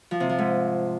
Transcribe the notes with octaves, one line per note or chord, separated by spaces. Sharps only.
F3
C3
F3
G#2